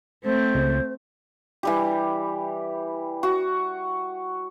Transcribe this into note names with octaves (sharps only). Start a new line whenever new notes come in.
A3 C4 C5
C#2
E3 G3 G4
F#4